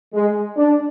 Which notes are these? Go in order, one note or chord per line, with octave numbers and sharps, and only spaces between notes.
G#3
D4